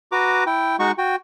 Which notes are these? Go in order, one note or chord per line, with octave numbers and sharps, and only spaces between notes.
F#4 B4 A#5 D6
E4 G5
G#3 D#4 F#4 F#5 C#6
F#4 G5